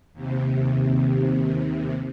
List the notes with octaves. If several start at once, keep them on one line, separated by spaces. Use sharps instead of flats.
D#2 C3